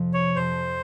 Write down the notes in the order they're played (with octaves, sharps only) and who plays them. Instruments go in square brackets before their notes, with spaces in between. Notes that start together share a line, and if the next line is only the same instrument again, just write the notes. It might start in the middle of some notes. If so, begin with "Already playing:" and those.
Already playing: [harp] F2 C3 F3
[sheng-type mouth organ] C#5
[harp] F2 C3 F3 [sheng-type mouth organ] C5